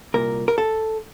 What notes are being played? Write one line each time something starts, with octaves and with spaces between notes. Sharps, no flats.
C2 A#2 A#4
A#4
A4